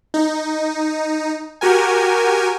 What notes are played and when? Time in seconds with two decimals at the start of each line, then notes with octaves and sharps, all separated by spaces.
0.14 D#4
1.61 F#4 G4 A#4 G#5